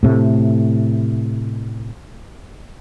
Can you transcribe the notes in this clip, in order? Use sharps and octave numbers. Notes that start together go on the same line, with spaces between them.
A2 C3 A3